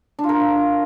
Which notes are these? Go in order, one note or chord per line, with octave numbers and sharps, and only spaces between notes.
D4
F4
A#4